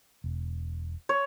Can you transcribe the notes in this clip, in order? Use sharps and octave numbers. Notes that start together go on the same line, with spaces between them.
E1
C#5